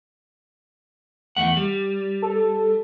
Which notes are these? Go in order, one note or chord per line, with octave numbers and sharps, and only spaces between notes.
E2 A3 F#5
G3
A4